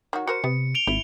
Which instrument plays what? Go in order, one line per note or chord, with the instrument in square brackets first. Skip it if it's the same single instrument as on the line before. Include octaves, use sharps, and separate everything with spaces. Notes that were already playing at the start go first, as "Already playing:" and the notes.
[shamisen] D#3 F#3 F#4
[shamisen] F#4 A#4 C5 [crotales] C#7
[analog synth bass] C3 [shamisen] B3
[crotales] D7 F7 G7
[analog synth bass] G#1 [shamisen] E4